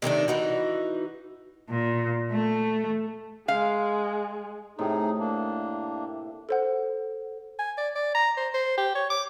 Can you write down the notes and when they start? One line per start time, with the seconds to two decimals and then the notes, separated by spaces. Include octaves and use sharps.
0.02 C3 D#3 A3 D4
0.28 E3 D#4 F#4
1.70 A#2
2.32 A3
3.48 G#3 F5
4.79 A2 C3 D#4 G#4
5.19 A#3 D4
6.49 A4 C5 F#5
7.59 G#5
7.77 D5
7.95 D5
8.15 A#5
8.37 C5
8.54 C5
8.77 G4
8.95 C#5
9.10 D6